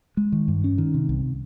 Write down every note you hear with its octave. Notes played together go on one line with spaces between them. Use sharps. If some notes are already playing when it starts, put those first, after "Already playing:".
G#3
D#3
G2
C#4
D#3
C3
C2